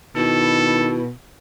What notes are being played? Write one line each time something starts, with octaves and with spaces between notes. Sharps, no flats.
B2 D#3 E4 A4